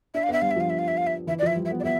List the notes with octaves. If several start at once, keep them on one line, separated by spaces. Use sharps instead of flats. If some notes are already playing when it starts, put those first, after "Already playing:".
D4 E5
F5
B3 E5
G3 F5
E5
F3 F5
E5
F5
E5
F5
E5
E3 E5
D5
F3 E5
G3
E5
B3
D5
B3 E5